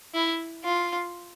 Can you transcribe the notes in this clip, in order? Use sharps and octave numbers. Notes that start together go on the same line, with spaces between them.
E4
F4